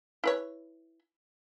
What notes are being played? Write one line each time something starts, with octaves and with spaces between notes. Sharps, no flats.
E4 B4 C#5